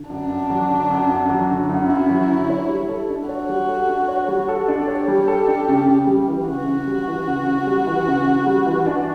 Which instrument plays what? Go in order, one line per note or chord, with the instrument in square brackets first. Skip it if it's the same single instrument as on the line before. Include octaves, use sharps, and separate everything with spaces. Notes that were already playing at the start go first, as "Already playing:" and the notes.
Already playing: [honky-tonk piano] D3
[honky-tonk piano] F#2 [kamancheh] D4
[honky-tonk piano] F#2
F#3
D3
F#2
F#2
F#3
D3
[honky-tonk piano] F#2 [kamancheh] E4
[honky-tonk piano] F#2
F#3
D3
C#5
G3
A4
D4
[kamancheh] F#4 [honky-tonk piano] C#5
[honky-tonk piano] G3
A4
D4
C#5
G3
A4
D4
[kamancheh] G4 [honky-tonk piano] C#5
[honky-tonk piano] G3
A4
D4
C#3
C#3
G3
E3
[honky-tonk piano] C#3 [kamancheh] F#4
[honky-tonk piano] C#3
G3
E3
C#3
C#3
G3
E3
C#3
C#3
G3
E3
D4